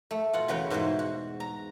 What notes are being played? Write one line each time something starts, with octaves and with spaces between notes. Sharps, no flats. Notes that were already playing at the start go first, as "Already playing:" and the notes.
A3
B2 F4 F#5
E2 C#3 F#4 B4 C#5 G5
G#2 B2 E3 F#4 C5
F#4
A#5